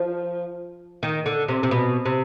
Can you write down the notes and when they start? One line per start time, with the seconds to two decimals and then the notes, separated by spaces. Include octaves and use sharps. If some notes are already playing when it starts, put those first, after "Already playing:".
Already playing: F3
1.03 D#3
1.26 D3
1.48 C3
1.63 C3
1.71 B2
2.06 C3